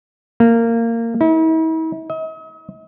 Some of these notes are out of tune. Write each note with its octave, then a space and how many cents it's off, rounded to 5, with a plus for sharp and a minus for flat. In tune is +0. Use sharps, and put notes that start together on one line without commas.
A#3 -20
E4 -45
D#5 +45